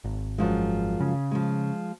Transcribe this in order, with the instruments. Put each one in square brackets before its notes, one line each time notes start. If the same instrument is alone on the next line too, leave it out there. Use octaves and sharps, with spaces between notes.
[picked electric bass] G#1
[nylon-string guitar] F#2 F3 G#3
[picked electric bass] C#3
[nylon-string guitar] F3 G#3